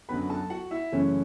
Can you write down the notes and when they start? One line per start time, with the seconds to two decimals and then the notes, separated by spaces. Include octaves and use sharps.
0.09 F#2 D3 F#3 B3 B4 B5
0.30 A4 A5
0.50 F#4 F#5
0.71 E4 E5
0.92 F#2 C#3 E3 A3 C#4